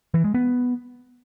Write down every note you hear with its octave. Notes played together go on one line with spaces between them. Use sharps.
E3
G#3
B3